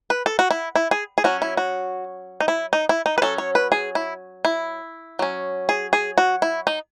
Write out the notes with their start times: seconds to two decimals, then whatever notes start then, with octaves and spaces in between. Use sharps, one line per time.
0.10 B4
0.26 A4
0.39 F#4
0.51 E4
0.76 E4
0.91 G#4
1.18 G#4
1.24 F#3 C#4 F#4
1.42 E4
1.57 F#4
2.40 D#4
2.48 E4
2.73 D#4
2.89 E4
3.06 D#4
3.18 B4
3.22 F#3 C#4 A4
3.38 C#5
3.55 B4
3.72 G#4
3.95 E4
4.45 E4
5.19 F#3 C#4
5.69 G#4
5.93 G#4
6.18 F#4
6.42 E4
6.67 D#4